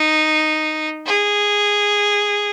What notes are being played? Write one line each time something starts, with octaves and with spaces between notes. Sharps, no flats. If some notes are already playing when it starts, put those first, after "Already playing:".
Already playing: D#4
G#4